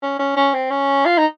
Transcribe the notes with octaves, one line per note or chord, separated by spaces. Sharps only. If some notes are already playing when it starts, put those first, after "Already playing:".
C#4
C#4
C#4
C4
C#4
F4
D#4